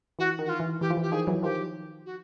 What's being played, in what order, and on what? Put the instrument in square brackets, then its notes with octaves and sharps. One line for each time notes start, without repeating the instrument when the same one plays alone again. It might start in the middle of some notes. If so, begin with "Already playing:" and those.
[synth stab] E3 [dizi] F#4
[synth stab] D#3
[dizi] F#4
F4
[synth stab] E3
[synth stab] E3 [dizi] G4
[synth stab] F3
E3
[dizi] G4
[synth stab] D#3 F3 [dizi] G#4
[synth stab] E3 F#3
[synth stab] D#3 F3 [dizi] G4
[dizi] F#4